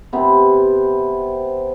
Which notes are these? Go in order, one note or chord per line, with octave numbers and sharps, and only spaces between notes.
C3 B3 C5